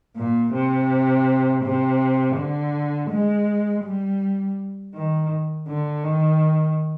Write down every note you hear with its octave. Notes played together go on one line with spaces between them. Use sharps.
A#2
C3
C3
D3
G#3
G3
D#3
D3
D#3